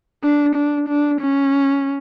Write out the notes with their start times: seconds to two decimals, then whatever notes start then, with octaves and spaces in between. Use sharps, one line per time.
0.23 D4
0.55 D4
0.89 D4
1.21 C#4